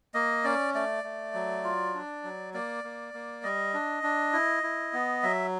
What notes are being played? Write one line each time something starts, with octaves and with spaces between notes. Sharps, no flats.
A#3 D#5
C#4 D5
A3 D5
A3
F#3
F4
D4
F#3
A#3 D5
A#3
A#3
G3 D#5
D4
D4
E4
E4
B3
F#3 E5